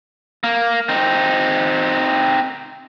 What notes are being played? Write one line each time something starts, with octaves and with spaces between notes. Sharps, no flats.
A#3
C4 D#4